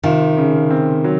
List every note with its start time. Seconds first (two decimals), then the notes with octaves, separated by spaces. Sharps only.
0.03 C3 D#3 F4
0.38 C#3
0.70 C4
1.04 F#3